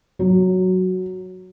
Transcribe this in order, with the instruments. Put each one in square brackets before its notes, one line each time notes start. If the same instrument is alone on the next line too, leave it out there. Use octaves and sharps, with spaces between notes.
[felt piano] F#3